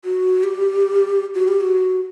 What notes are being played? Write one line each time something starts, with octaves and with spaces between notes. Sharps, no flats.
F#4
G4
F#4
G4
F#4